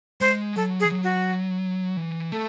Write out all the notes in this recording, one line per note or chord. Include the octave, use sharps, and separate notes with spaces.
G#3 C5
F#3 A4
G#4
E3
F#3
F#4
E3
A3 A4